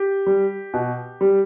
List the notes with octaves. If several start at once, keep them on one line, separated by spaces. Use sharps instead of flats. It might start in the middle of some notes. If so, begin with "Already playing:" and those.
Already playing: G4
G3
B2
G3